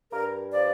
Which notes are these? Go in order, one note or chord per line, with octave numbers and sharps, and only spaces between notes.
G2 A#4
F3 D5